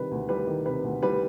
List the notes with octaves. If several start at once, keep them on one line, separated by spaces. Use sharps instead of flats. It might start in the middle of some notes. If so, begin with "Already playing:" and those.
Already playing: C3 D#3 G3 B4
D2
G3 B4
D#3
C3 B4
D2
G3 B4